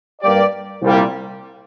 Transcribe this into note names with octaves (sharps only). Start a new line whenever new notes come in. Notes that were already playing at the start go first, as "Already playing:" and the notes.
G2 G3 A#3 G4 D5
C2 A#2 G3